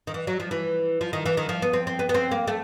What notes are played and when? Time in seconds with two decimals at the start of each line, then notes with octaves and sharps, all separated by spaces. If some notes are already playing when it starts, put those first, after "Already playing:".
0.07 D#3
0.14 E3
0.27 F#3
0.40 F3
0.51 E3
1.01 F3
1.13 D#3
1.26 E3
1.37 D#3
1.49 F3
1.62 B3
1.73 C4
1.87 C4
1.99 B3
2.09 B3
2.14 C4
2.31 A#3
2.48 A3